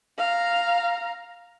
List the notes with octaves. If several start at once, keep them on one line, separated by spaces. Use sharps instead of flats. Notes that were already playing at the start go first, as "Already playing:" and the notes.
F5 A#5